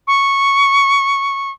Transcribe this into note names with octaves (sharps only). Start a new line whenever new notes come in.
C#6